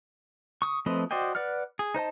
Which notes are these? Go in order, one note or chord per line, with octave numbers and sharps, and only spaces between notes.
C#6 D#6
F3 A3 C4 B4 D#5
F#4 C5 D5 D#5 G5
B4 D5 F#5 F6
G#4
D#4 C5 D#5 A5